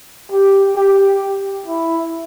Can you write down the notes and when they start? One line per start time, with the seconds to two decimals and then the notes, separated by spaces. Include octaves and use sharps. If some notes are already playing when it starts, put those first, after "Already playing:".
0.32 G4
0.76 G4
1.66 E4